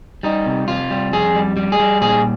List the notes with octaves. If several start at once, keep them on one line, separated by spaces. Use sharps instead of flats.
G3 D#4
C3
C3 F4
G3
F2 G#4
G3
G3
G#4
G3
A#2 G#4